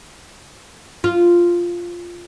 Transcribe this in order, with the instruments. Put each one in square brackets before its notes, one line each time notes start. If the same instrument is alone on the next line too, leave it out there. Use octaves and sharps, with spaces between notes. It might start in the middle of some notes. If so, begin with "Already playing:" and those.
[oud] F4